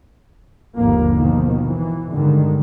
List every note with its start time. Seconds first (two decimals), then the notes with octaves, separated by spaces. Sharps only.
0.78 G1 D#2 G#2 D3 F3 A#3
1.19 B2 D#3 F3
1.68 E3
2.13 G2 D3 D#3 G#3